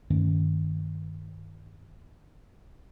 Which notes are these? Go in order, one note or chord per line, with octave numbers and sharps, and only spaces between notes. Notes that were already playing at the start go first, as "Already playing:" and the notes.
G2 D#3 A3 C#4